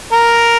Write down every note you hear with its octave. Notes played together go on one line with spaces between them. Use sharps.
A#4